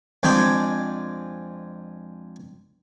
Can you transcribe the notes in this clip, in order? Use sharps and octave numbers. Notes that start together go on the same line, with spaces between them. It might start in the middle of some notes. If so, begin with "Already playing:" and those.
F2 G#3 D4 G5